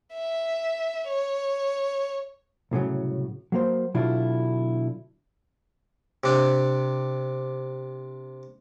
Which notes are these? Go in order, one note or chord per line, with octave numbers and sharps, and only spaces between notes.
E5
C#5
C2 A2 C#3 F#3
F#3 A#3 C5
B2 D3 F#3 D4 E4 F4
C3 D4